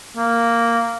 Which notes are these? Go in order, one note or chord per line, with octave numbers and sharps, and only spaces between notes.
A#3